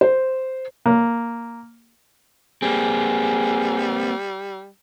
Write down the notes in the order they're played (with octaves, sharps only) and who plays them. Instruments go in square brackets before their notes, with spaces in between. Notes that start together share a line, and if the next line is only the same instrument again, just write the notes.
[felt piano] C5
[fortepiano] A#3
[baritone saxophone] G3 [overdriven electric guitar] A#3 C4 [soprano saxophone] G#4